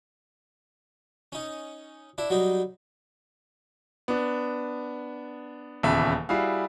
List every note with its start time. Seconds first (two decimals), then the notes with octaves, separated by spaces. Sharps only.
1.32 C#4 D#4
2.18 D4 E4
2.30 F#3 G3 D#4
4.08 B3 D4
5.83 D#1 E2 C#3 E5 A5 B5
6.29 G3 E4 F#4 G#4 F5